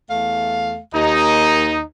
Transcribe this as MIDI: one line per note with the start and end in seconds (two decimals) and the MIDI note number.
0.10 0.79 40
0.10 0.79 57
0.10 0.79 77
0.94 1.80 39
0.94 1.82 63